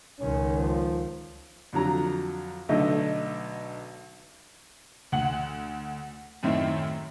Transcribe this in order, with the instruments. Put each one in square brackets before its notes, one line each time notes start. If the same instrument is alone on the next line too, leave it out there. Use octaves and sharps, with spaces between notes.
[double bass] C#2 D#3 [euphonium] C#4
[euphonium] F3
[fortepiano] F2 D3 F#3 A#5
B1 D3 A3 D4 D#5
[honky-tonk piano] D2 F#5 F#7
F#2 A2 D#3 C4 E4